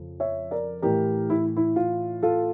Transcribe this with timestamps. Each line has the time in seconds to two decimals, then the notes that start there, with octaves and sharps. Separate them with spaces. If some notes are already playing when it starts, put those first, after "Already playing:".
Already playing: F2 C#3
0.20 C#5 E5
0.51 A#4 D5
0.82 A2 E3 G4 A#4
1.30 E4
1.57 E4
1.76 F4
2.23 F4 A4